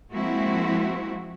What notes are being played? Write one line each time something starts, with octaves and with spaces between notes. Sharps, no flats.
F3 G#3 A#3 C4 E4 F#4